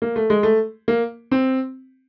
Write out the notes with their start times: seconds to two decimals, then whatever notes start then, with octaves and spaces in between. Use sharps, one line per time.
0.02 A#3
0.16 A3
0.30 G#3
0.43 A3
0.88 A#3
1.31 C4